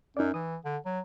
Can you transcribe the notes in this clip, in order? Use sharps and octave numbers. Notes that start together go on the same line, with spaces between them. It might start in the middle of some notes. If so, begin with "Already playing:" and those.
F#2 D#4 D5
E3 D#6
D3
F#3